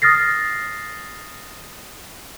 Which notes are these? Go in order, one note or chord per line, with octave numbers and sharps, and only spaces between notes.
D#6 F6 A6 A#6 C7